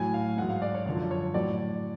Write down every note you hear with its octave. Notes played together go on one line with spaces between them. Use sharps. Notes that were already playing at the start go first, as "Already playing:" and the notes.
Already playing: A2 F#3 G#5
F5
G#2 F#3 F#5
F5
D5
C#5
F#2 D3 F3 C#5
C#5
A2 F#3 D5